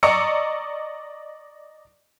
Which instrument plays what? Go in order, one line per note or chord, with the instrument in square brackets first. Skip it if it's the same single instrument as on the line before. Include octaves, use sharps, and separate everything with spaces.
[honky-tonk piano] D5 D#5 A#5 C#6 E6 C#7